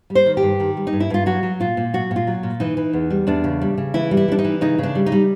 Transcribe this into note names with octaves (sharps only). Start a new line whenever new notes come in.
G3
C5
D#3
G4
G2
D#3
G3
D#4
G2
E4
G2 F4
F#3 F#4
F#3
A#2 F4
A#2
F#3 F#4
A#2
F4
F#3
A#2
E3 D#4
E3
E2
G3
E2 D4
C#3
G3
C#3
E3 E4
G3
E4
G3 D4
D#4
E3
C#3 D#4
C#3 D4
G3
D#4
G3